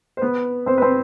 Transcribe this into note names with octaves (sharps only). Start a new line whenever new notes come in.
C5
B3 B4
C4 C5
B4
C4 C5